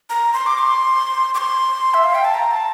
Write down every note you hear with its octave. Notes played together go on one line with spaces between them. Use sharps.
A#5
C6
D6
C6
D6
C6
E5
F5
G5
A5
A#5
A5